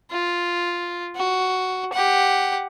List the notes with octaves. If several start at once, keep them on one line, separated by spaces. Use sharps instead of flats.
F4
F#4
G4 F#5